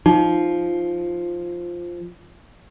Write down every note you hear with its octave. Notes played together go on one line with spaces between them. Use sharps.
F3 D#4